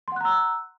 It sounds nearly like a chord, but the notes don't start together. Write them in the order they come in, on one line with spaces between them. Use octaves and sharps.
C6 F#5 F#6 A#5 E6